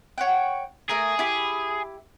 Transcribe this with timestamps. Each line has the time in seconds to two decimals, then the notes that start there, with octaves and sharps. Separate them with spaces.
0.18 C#5 F#5 G5
0.89 A3 G#4 A#4
1.19 E4 G4 B5